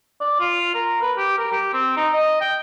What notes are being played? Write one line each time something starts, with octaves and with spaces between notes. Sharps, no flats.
D5
F4
A#4
B4
G4
A#4
G4
C4
D#4
D#5
G5